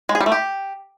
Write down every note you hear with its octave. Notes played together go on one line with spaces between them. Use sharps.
G#3
G#4
G3
A3
G4